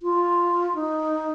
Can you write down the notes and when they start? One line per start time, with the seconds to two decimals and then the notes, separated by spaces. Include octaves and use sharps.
0.02 F4
0.75 D#4